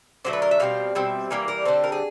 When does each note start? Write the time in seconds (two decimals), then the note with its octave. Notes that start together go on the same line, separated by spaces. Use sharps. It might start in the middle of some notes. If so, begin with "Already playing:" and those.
0.25 D3 F#3 A3 C5
0.33 B4
0.42 A#4
0.51 E5
0.60 B2 G3 C4 F5
0.95 B2 G3 C4 E5
1.31 E3 G3 A#3 A#4
1.48 A#4
1.65 D3 G3 C4 A4
1.84 A#4
1.92 G#4